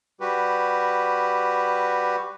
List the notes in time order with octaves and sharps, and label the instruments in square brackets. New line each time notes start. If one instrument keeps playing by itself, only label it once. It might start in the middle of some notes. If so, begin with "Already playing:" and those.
[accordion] G3 F#4 G4 B4